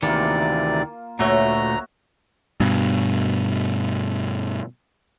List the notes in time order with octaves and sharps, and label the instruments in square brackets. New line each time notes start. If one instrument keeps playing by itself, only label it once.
[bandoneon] D2 C3 D5 [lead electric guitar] D#3 E3 [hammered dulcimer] A#3 F4
[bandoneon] D2 A#5 [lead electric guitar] A#2 A3 [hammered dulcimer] F#4 C#5 E5
[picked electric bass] G2 B2